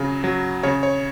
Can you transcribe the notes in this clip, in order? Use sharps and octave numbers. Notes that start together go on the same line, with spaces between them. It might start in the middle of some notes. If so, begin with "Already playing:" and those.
Already playing: C#3 F#3
F#3
C#3 C#5
C#5